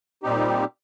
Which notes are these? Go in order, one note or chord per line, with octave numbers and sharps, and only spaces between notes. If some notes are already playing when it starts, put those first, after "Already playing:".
A#2 G3 C4 D#4 G4